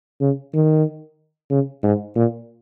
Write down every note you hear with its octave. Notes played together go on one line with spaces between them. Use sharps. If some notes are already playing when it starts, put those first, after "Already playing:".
C#3
D#3
C#3
G#2
A#2